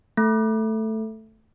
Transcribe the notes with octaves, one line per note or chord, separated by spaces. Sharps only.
A3